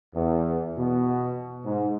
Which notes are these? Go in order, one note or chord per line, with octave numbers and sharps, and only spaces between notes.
E2
B2
G#2